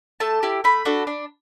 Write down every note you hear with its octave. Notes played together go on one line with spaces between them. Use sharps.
A3 A5
E4 G4
A3 B5
D4 F#4 A4
D4